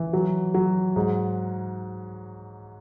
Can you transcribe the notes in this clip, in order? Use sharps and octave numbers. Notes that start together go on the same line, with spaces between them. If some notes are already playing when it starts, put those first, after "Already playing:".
Already playing: E3
F#3
F#3
G#2